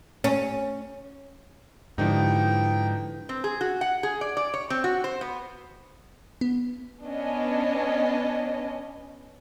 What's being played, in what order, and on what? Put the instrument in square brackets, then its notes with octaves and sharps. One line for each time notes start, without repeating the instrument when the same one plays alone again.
[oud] C#4
[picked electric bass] G#2 [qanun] D3 E3 G4 [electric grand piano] F3 D#4 [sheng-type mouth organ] G5
[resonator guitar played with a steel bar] C4
G#4
F#4
F#5
G#4
D5
D5
C#5
C4
F#4
C5
B3
[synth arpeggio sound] B3
[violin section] B3 C#4 D4 D#5